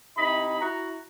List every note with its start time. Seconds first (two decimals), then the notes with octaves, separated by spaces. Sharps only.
0.17 C3 D#4 E4 D#5 B5
0.60 E4 F#4 A#5